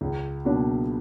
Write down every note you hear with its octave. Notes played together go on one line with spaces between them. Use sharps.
C#2
B2 F#3 A#3 D4